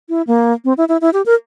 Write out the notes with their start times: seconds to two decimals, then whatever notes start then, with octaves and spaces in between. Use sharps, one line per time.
0.09 E4
0.27 A#3
0.65 C4
0.78 E4
0.89 E4
1.01 E4
1.13 G4
1.26 A#4